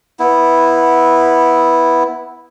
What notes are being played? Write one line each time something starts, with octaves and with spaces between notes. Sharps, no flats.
B3 E4